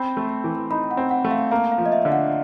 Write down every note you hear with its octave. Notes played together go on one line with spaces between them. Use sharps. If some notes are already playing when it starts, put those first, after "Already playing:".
Already playing: C4 B5
A3
E3
D#4 B5
F#5
C4
F#5
A3
F5
A#3 F5
F5
F3
D#5
E5
D3
F#5